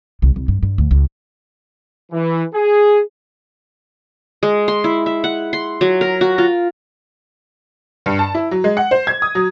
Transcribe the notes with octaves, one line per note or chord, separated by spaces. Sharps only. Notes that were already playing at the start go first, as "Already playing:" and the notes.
C2
C2
G2
G2
D2
C#2
E3
G#4
G#3
C6
E4
E5
F#5
C6
F#3
A#4
F#4
F4
G2
A5
E4
F#3
G#3
F#5
C5
G#6
D#6
F#3